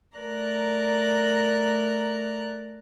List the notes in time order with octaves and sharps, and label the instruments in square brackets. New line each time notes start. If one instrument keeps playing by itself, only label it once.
[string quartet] A3 A#4 D5 A#5 F#6